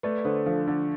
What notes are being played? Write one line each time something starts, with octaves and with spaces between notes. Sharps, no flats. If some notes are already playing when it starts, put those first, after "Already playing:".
A3 B4 D5
D3 A4 C5
F3 D4
D3